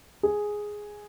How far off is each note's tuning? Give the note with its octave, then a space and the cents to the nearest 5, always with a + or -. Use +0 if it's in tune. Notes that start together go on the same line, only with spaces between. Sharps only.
G#4 +0